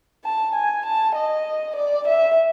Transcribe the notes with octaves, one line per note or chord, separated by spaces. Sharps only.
A5
G#5
A5
D#5
D5
E5